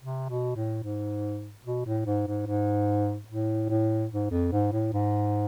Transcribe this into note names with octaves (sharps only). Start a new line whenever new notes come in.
C3
B2
A2
G#2
B2
A2
G#2
G#2
G#2
A2
A2
G#2
F2
G#2
A2
G#2